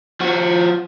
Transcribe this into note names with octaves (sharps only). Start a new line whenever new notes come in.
F3 F#4